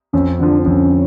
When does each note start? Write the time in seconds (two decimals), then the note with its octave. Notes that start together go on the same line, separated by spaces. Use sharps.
0.13 F2 C#4
0.40 D3 F3 D4
0.59 C4
0.65 F2 C#4